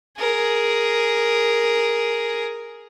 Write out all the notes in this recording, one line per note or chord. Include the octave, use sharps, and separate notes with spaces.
G#4 A#4